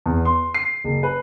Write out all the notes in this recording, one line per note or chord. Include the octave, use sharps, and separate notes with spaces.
E2
C6
C7
F#1
B4